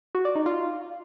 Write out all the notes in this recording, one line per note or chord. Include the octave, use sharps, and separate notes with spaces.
F#4
D5
D#4
F4